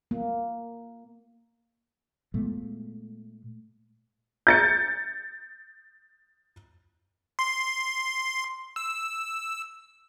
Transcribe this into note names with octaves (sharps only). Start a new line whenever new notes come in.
A#3
A#2 G#3 A3 B3
G6 A6 C#7
C6
E6